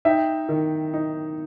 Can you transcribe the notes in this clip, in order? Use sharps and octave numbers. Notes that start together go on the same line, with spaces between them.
D#4 E5 G5
D#3
D#4